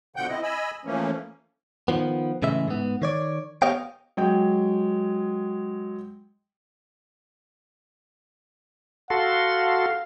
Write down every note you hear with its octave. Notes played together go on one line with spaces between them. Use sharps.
B2 D3 F3 F#5 G5 G6
C4 E4 D#5
D#5 G#5 B5 E6
E3 F3 A3 A#3 C#4
D#3 F3 B3
A2 C#3 E3 G#3 E5
G#2 B3
D#3 C#5 D5
B3 G4 C#5 D#5 F5 G5
F#3 G#3 G5
F#4 A4 F5 C6